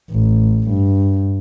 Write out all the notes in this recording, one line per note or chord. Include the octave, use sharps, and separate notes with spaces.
A1
G2